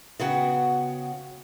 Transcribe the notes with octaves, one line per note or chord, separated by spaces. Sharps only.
C#3 B3 F#4 F#5 G5